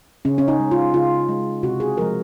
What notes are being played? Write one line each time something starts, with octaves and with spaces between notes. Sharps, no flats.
C#3 C#4
C#4
D#4
G#3
F4
C#3 F4
G#3
C3 F#4
G#4
F3 G#3 A#4